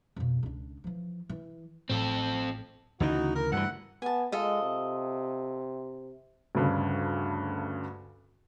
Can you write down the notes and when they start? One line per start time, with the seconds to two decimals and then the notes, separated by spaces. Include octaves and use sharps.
0.16 F2 B2
0.43 C#2 D4
0.84 E3 F3
1.29 E3
1.89 A1 A2 C4 A4
3.00 D2 C#3 E3 D#4 F#4
3.35 A#4
3.52 D2 G2 E3 E5 F#5
4.02 B3 G#5 A5
4.32 G#3 F4 A4 D#5
4.63 C3
6.55 D2 G2 C#3